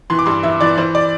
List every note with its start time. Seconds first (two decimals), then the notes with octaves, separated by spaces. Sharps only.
0.10 E3 C6
0.19 D6
0.26 G2 C6
0.43 E3 E5
0.61 E3 D5
0.78 E3 C5
0.95 D5